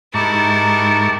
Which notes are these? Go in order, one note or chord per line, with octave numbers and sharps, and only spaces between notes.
G#2 D#4 E4 G4 A#4 A5 C#6